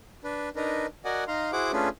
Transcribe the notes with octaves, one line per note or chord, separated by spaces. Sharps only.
D4 B4
D4 D#4 A#4 B4
F#4 A#4 D5 D#5 F#5 G#5
D#4 F5 A#5 C6
E4 F#4 G#4 C5 F#5 D6
A3 C#4 D4 F4 G#4 B4